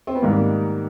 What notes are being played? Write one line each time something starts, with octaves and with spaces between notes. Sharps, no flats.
C4
B3
G#2 D#3 G3 A#3